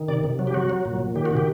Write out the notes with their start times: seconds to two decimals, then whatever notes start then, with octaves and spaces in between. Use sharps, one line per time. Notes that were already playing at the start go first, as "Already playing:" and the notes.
Already playing: D#3
0.08 C3 D5
0.24 C3
0.39 F#3
0.47 G4
0.54 F#3 F#4
0.70 F#3
0.85 A#2
1.00 A#2
1.15 D#3 G4
1.25 F#4
1.31 C3
1.37 G4